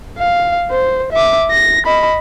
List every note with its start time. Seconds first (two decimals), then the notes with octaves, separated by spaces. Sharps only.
0.19 F5
0.70 C5
1.12 E5 D6
1.51 A#6
1.86 D#5 B5